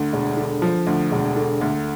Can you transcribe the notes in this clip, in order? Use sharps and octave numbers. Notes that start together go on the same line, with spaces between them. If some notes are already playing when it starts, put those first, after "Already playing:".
Already playing: D2
E1
D3
F3
D2
E1
D3
D2